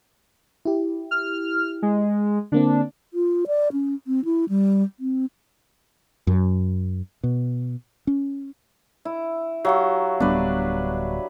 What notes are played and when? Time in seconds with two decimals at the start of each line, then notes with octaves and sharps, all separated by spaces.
0.65 E4 G4
1.11 F6
1.82 G#3
2.52 D3 A#3 C4 D4
3.14 F4
3.47 D5
3.72 C#4
4.07 C4
4.25 E4
4.49 G3
5.00 C4
6.27 F#2
7.23 B2
8.07 C#4
9.05 E4
9.65 F#3 G4 F5 C#6
10.20 D1 G3 B3 D4 B4